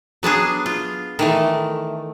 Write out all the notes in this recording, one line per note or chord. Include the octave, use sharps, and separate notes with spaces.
F#3 B3 D4 G#4
F4
D#3 E3 A3